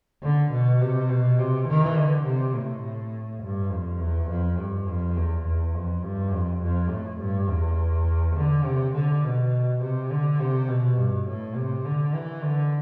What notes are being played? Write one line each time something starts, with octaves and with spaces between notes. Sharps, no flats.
D3
B2
C3
B2
C3
E3
D3
C3
A2
G2
F2
E2
F2
G2
F2
E2
E2
F2
G2
F2
F2
A2
G2
E2
D3
C3
D3
B2
C3
D3
C3
B2
G2
A2
C3
D3
E3
D3